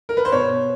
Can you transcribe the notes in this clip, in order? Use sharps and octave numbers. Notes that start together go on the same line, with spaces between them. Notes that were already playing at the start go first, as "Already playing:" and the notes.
A#4
B4
C5
B2 C#5